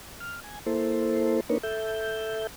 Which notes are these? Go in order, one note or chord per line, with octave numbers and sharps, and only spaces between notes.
F6
G#5
A#3 E4 A4 C5
A#3 D4 D#4 A#4 B4 C#5
A4 E5 G6